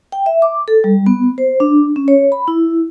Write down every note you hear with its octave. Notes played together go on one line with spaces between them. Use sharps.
G5
E5
D6
A4
G3
B3
C5
D4
C#4
C#5
B5
E4